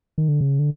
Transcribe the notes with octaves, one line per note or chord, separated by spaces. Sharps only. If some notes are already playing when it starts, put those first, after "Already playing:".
D#3
D3
C#3
D3